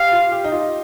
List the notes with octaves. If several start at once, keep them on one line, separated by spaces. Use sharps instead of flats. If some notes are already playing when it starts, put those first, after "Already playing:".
Already playing: G4 F5
F4
G4
D#4
F4